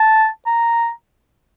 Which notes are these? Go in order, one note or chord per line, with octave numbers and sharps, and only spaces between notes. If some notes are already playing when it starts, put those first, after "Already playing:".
Already playing: A5
A#5